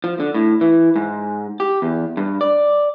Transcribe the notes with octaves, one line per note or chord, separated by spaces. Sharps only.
F3
D3
A2
E3
G#2
G4
E2
G2
D5